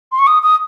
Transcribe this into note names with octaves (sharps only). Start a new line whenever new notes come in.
C6
C#6
D#6
D#6